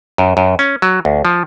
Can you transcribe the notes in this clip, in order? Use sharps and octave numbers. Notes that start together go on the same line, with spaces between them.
F#2
F#2
C#4
F#3
D2
F3